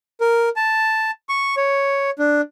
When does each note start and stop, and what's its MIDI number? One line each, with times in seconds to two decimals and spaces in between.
0.21 0.49 70
0.56 1.11 81
1.29 1.55 85
1.57 2.10 73
2.19 2.41 62